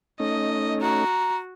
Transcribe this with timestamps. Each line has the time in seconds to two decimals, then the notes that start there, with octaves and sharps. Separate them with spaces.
0.20 A3 C#4 D#4 D#5
0.81 F#4 A#5